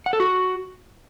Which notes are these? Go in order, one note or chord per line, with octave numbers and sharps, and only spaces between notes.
F#5
A4
F#4